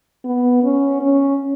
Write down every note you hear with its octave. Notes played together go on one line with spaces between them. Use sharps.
B3
C#4
C#4